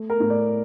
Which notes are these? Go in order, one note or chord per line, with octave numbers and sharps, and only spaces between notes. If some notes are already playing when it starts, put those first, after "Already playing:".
Already playing: A3
A#4
A2
D5